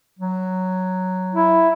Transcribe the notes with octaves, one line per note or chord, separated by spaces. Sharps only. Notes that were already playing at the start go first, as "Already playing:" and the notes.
F#3
E4